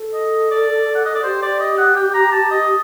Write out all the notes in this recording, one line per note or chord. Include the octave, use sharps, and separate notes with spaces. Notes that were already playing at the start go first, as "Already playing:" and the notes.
Already playing: A4
D#5
D5
F#5
D#5
D5
G4 C5
D5
D#5
F#5
G5
A#5
A5
D#5